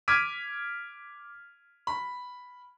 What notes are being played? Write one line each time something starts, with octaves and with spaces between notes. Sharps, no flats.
D6 F6 G#6 B6 D7 D#7
B5